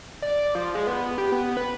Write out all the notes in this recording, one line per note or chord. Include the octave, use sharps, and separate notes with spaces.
D5
F3
G#3
B3
G4
B3
B4